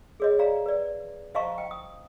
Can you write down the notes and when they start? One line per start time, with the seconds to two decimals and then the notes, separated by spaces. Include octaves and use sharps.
0.20 G#4 C#5 D#5
0.39 D5 F5 A#5
0.66 B4 D5
1.35 C5 D#5 F5 A5 A#5 C#6
1.58 G5
1.71 D#6